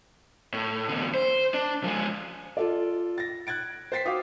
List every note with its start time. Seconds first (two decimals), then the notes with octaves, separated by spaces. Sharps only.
0.53 A2
0.88 E2 D3
1.14 C5
1.54 D4
1.84 F3 G#3
2.57 F4 A4 D5
3.18 A6 A#6
3.47 F#6 G#6 A6 D7
3.92 C5 G5 A6 B6 C7
4.05 F#4 C5 F5 G5 D6 D#6